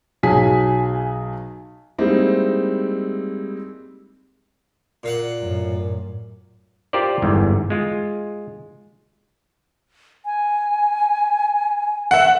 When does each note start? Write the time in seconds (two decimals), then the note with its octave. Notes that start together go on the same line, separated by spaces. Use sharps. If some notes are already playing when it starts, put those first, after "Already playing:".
0.23 B1 F#3 G#4 G#5 B6
1.98 G3 G#3 A#3 C4 D#4 E4
5.03 A#2 F5 F#5
5.39 F#2 A2
6.93 F4 G4 A#4 C5 D5
7.22 G1 E2 G#2
7.70 G#3 F4
10.25 G#5
12.11 E5 F#5